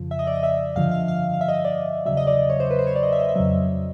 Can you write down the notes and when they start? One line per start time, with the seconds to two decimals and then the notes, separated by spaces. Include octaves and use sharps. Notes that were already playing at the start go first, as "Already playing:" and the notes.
Already playing: F2 C#3 F3
0.11 E5
0.19 D#5
0.27 D5
0.35 D#5
0.43 E5
0.76 G2 D3 F3 F5
0.91 F5
1.08 F5
1.34 F5
1.41 E5
1.49 D#5
1.57 E5
1.65 D5
2.06 E2 C#3 F#3 E5
2.17 D#5
2.27 D5
2.50 C#5
2.60 C5
2.71 B4
2.79 C5
2.87 C#5
2.96 D5
3.03 D#5
3.12 E5
3.19 D#5
3.29 E5
3.36 F2 C#3 F#3